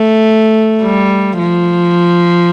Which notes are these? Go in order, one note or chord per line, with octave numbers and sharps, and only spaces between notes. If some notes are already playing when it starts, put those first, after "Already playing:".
Already playing: A3
G3
F3